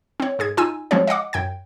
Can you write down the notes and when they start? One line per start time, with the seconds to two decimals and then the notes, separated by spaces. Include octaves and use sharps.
0.20 C4 C#5
0.39 G#2 G#4 G#6
0.57 D#4 F4 G#5 E6 D#7
0.91 F3 G#3 C4 C#4 F#4 C#5
1.07 D#5 F5 F#5 D6
1.33 F#2 G5 G#6